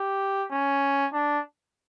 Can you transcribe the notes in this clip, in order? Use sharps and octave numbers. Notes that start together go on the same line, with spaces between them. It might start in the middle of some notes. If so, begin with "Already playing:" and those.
Already playing: G4
C#4
D4